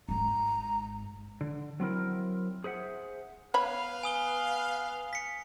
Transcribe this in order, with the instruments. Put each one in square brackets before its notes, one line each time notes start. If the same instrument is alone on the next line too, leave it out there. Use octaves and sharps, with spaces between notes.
[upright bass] G#1 G#2 [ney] A#5
[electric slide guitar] D3
F#3 C4 E4 A#4
G#4 C5 E5 F#5
[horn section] B3 B4 F5 [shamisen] C#5 B5
[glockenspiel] G#5 D#6 G7
B6 C#7